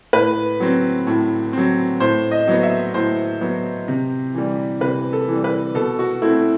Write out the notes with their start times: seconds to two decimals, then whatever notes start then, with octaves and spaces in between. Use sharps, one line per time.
0.13 A2 B4
0.60 F#3 C4
1.07 A2
1.53 F#3 C4
2.00 A2 C5
2.31 D#5
2.48 F#3 B3
2.63 E5
2.94 A2 C5
3.41 F#3 B3
3.88 C3
4.34 E3 G3
4.81 C3 B4
5.13 A4
5.28 E3 G3
5.44 B4
5.75 B2 A4
5.99 F#4
6.22 A3 C4 E4